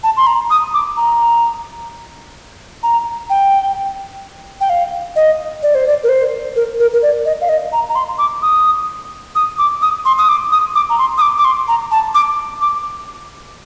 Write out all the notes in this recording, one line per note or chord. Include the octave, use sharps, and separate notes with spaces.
A5
C6
A#5
D#6
D6
A#5
A#5
G5
G5
F5
D#5
D5
C5
D5
A#4
C5
A#4
A#4
A#4
D5
D#5
F5
D#5
A#5
A#5
C6
D6
D#6
D#6
D6
D#6
C6
D#6
D6
D#6
D6
A#5
C6
D#6
D6
D6
C6
A#5
A5
D6
D6